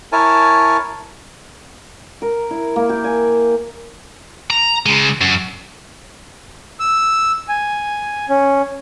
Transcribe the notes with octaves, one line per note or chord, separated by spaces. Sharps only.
E4 A#4 C#5 G#5 A5
A#4
E4
A#3
G4
G#5
A#5
C#3 G#3
F#2
E6
G#5
C#4